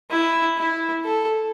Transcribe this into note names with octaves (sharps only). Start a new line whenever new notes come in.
E4
E4
A4